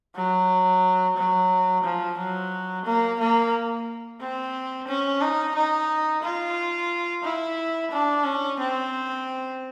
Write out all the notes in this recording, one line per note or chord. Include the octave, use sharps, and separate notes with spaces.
F#3
F#3
F3
F#3
A#3
A#3
C4
C#4
D#4
D#4
F4
E4
D4
C#4
C4